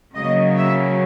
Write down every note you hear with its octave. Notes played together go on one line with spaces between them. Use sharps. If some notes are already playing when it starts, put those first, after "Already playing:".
C#3 F#3 A#3 D#5
E5